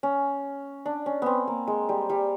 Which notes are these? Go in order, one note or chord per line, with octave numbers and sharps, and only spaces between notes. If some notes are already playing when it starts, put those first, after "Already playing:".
C#4
D4
C#4
B3 C4
A#3
G#3
G3
G3